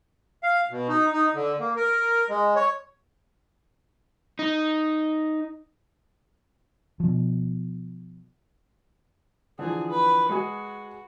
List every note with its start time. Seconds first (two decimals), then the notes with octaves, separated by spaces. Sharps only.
0.43 F5
0.71 B2
0.89 D#4
1.13 D#4
1.35 D3
1.60 A#3
1.77 A#4
2.29 G#3
2.56 C#5
4.39 D#4
7.00 B2 F3
9.59 D3 E3 F3 G#4
9.91 B4
10.29 G#3 F#4 G#4